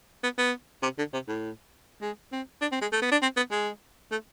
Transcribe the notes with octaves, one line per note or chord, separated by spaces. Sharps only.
B3
B3
C3
D3
C3
A2
G#3
C4
D4
C4
G#3
A3
B3
D4
C4
B3
G#3
A3